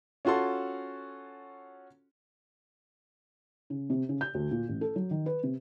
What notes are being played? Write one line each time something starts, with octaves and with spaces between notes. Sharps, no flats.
C#4 F4 F#4 A4 C6
C#3
C3
C#3
G6
D2
A#2
A1
A4
F#3
D#3
B4
C3